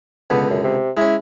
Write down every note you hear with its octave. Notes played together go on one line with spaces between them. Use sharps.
C#2 B2 D3 B3
F#2
C3
G#3 C#4 E4